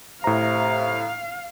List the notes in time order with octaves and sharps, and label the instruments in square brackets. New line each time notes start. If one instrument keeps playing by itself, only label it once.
[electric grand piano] A2 A#5 [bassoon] C3 [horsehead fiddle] F5